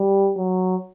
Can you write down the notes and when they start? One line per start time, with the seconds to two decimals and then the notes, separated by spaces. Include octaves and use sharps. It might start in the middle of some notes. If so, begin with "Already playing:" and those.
Already playing: G3
0.37 F#3